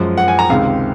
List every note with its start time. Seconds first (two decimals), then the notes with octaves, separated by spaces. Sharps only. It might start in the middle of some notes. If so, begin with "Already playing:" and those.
Already playing: F#2 F3 G#3
0.17 F#5
0.28 G#5
0.39 A#5
0.50 C#2 C3 D#3 G#3 F5